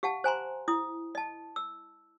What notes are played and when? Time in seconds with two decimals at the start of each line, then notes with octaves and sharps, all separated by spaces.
0.03 G4 F5 F#5 A5
0.24 C5 G#5 A#5 C6
0.68 E4 D#6
1.15 D#5 A5
1.56 E6